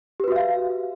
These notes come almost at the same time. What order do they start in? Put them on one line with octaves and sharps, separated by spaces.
G4 B4 F#4 E5 F5